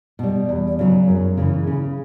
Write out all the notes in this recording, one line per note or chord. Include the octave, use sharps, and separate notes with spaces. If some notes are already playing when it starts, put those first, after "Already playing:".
B2 G3
E2
C#3 F#3
F#2
C#3 E3
C#3